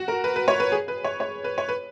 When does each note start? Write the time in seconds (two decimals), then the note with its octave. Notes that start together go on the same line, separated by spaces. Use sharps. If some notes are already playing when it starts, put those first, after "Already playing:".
Already playing: F#4
0.08 A#4
0.24 B4
0.36 B4
0.48 C#5
0.60 B4
0.72 G#4
0.88 B4
1.04 C#5
1.20 C#5
1.44 B4
1.58 C#5
1.68 B4